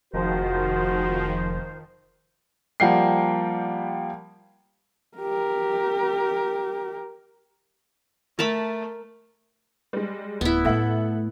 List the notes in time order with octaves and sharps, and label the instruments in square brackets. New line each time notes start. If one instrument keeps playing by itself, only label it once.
[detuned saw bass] F1 [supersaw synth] D#3 F3 [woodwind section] G#3 A#4 C5 [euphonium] F#4
[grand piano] F3 G3 A#3 F#5 G5 C7
[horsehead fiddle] G4 A#4
[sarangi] A3 [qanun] A#4 A5 B5
[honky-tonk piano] G3 G#3
[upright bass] D1 [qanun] B3 E4
[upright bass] A2 A3 [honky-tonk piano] A4 E5 F#5